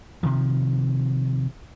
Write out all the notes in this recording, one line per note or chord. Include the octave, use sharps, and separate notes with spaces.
C3 D#3 F3